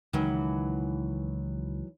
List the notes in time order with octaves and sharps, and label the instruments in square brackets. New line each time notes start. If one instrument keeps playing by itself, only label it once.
[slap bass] C#2 [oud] D#3 E3 F#3